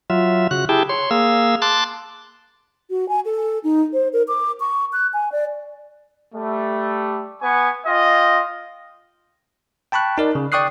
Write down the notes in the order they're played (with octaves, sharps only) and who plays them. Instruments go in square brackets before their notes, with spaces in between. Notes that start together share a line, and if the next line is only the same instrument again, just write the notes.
[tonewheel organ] F#3 F4 E5
C#3 F#4 F#6
E4 G4 G#4 G5 A5
C#5 C6
A#3 G#4 F5 E6
A5 C6 D6 F#6 A6
[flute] F#4
G#5
A4
D#4
C5
A#4
D6
C#6
F#6
G#5
D5
[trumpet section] G3 A3
B3 G#5 C#6
F4 D#5 G5
[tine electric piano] G5 A5 B5 C#6 F#6
D#4 A#4 D5
C#3
D5 G5 C#6 D#6 F#6 C7